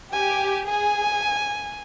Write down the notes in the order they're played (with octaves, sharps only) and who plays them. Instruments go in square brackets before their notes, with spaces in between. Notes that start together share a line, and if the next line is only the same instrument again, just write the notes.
[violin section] G4 [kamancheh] G#5
[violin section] G#4 [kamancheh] G#5